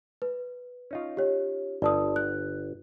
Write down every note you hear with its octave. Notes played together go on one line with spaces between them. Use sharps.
B4
C#4 D#4 F4
G4 C#5
G1 D5 A5 D#6
F#6